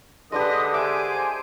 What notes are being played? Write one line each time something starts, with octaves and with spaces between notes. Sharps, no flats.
D3 G#3 D4 G4 B4 D#5 D#6
G#4 C5 E5 G#5 D6